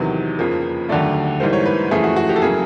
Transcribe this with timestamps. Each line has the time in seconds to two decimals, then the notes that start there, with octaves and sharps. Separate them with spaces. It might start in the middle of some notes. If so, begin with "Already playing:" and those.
Already playing: E2 C3 D#3 F#3 B4
0.39 F2 C#3 F3 A#3
0.89 D#2 D3 F#3 A3 D5
1.40 G#2 E3 G3 A#3 C5
1.53 C#5
1.66 B4
1.91 F2 C#3 E3 A3 G#4
2.04 F#4
2.16 F#4
2.29 G4
2.36 A4
2.42 C#3 F#3 A#3 G#4